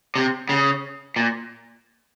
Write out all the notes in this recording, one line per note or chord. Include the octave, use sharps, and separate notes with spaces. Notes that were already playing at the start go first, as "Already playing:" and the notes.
C3
C#3
A#2